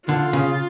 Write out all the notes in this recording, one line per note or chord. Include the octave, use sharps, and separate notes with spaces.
D3 F4
C#3